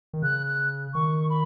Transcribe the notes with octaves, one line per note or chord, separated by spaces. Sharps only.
D#3
C#3 F#6
F#6
D#3 C#6
B5